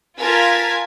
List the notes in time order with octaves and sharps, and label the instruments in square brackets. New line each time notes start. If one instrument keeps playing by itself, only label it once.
[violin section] F4 A#4 G#5 A5 G#6 B6